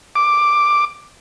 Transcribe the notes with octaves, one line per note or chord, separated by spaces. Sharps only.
D6